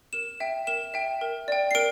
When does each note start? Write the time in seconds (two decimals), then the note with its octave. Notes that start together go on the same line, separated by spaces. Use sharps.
0.13 A#4 E7
0.40 E5 G5
0.67 A#4 E7
0.94 E5 G5
1.21 A#4
1.48 D5 G5
1.71 C7
1.75 A#4 D7